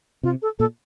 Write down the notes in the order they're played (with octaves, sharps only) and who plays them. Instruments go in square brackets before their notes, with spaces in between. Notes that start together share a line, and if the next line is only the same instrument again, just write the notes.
[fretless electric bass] C3 [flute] F4
[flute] A4
[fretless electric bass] A#2 [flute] A4